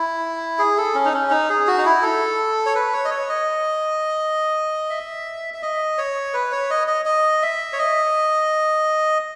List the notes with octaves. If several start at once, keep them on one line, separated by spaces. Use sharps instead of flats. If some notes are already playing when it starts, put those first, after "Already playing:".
Already playing: E4
G#4
A4
C#4
D#4
C#4
D#4
G#4
F#4
D#4
E4
A4
C#5
B4
C#5
D#5
C#5
D#5
E5
E5
D#5
C#5
B4
C#5
D#5
D#5
D#5
E5
C#5
D#5